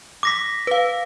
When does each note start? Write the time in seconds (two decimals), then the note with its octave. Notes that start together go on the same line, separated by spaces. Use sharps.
0.23 D6 A#6 B6
0.67 B4 F5